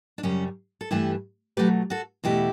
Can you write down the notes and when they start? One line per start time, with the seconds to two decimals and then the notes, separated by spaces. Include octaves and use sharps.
0.18 D4
0.23 F#2 C#3 G3 C#4
0.81 A4
0.91 G2 E3 A3 E4 G4
1.57 B2 F#3 A3 G4 B4
1.90 F#4 A4
2.24 E2 B2 A3 E4 G4